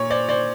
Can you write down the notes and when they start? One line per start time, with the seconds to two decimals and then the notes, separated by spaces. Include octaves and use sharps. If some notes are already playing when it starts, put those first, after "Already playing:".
Already playing: A#2 C#5
0.10 C5 D5
0.29 C5 D5